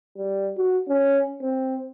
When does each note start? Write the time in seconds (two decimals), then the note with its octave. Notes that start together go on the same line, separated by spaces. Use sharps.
0.17 G3
0.57 F#4
0.88 C#4
1.41 C4